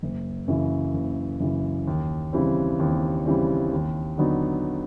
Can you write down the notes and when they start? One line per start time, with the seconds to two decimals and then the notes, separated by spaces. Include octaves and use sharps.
0.03 F#1
0.48 F#2 C#3 E3
0.94 F#1
1.40 F#2 C#3 E3
1.87 D#2
2.33 C#3 E3 G3 C4
2.79 D#2
3.26 C#3 E3 G3 C4
3.72 D#2
4.18 D3 F#3 B3 D#4